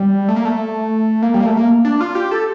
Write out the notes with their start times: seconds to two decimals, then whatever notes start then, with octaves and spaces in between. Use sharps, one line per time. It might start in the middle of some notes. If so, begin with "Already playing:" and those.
Already playing: G3
0.28 A3
0.36 A#3
0.45 A3
1.22 A#3
1.34 G3
1.41 A#3
1.46 A3
1.57 A#3
1.85 D4
2.01 F4
2.15 G4
2.31 A4